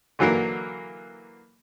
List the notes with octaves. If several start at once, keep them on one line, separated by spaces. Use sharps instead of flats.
D3 E3 F#3 A#3 A#4